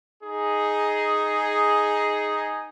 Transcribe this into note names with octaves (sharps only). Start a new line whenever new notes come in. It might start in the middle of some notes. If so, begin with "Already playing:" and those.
D#4 G#4